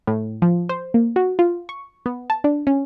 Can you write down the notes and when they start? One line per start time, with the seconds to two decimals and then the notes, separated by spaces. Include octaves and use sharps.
0.07 A2
0.42 F3
0.69 C5
0.94 A#3
1.16 F#4
1.39 F4
1.69 C#6
2.06 B3
2.30 A5
2.44 D4
2.67 C#4